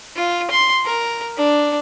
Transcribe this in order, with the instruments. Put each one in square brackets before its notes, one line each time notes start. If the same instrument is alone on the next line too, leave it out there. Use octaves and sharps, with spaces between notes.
[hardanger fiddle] F4
C6
A#4
D4